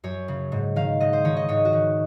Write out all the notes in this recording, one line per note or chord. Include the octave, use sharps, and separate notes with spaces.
F#2 C#5
C#3
G#2
D#3 F5
G#2 D#5
C5
D#3 C#5
D#5
G#2 C#5
F#4
D#3